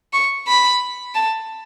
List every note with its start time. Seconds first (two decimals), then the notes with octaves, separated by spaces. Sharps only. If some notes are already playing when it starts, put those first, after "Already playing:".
0.13 C#6
0.48 B5
1.15 A5